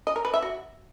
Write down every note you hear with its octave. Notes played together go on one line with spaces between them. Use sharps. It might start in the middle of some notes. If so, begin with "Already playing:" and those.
D#5
A#4
B4
E5
F#4